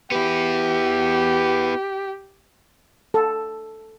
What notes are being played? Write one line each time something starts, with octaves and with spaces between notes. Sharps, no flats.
B3 E4 G4
A4